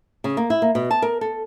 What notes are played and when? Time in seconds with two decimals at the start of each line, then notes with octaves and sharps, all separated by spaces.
0.24 C#3
0.37 A#3
0.50 E4
0.62 A#3
0.75 B2
0.91 A5
1.02 A#4
1.21 A4